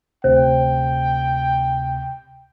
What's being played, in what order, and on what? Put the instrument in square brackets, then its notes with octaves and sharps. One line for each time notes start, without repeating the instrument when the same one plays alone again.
[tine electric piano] D2 C3 [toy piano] C5 [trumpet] G5